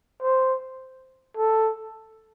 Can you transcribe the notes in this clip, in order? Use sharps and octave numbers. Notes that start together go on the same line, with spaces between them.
C5
A4